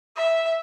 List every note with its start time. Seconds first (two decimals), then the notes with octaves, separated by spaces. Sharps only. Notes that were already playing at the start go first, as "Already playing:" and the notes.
0.16 E5